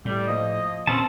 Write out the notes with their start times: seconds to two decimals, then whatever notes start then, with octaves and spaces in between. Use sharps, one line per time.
0.05 A2 G3
0.28 F3 A#3 D#5
0.87 A#2 C4 C#4 A5